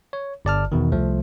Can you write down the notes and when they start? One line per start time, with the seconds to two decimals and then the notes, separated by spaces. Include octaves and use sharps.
0.13 C#5
0.45 G1 D5 A5 F6
0.72 E2 B2 D#3
0.92 C2 F3 A3